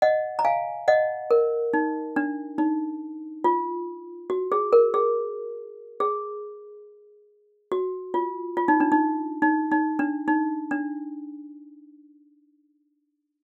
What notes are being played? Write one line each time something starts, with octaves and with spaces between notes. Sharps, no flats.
D#5 F#5
A#5
F5 G#5
D#5 F#5
A#4
D#4
D4
D#4
F4
F#4
G#4
A#4
G#4
G#4
F#4
F4
F4
D#4
D4
D#4
D#4
D#4
D4
D#4
D4